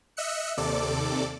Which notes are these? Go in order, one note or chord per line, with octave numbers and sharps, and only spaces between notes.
D#5 E5 E6 F#6 C#7
D#2 C3 A4 D5 D6